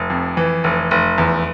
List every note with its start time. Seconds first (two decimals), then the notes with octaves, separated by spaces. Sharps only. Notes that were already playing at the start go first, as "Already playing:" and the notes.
Already playing: F1
0.10 F2
0.37 E3
0.64 F1
0.91 F1
1.18 E2